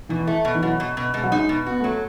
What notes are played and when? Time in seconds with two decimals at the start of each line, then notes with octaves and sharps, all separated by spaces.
0.09 B2 E3
0.27 A3
0.45 B2
0.55 E3
0.62 B2 F#3
0.80 B2
0.97 B2
1.14 B2 G#3
1.23 F#3
1.32 G#3 D#4
1.49 B2
1.66 B3 F#4
1.81 F#3 A3